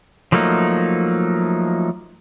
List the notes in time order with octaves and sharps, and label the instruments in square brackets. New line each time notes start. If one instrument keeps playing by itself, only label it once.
[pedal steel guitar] F3 F#3 A3 A#3 D#4